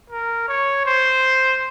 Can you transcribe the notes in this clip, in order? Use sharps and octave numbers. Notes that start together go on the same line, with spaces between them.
A#4
C#5
C5